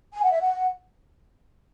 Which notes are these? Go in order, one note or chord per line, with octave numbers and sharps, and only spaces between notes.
G#5
F#5
E5
F#5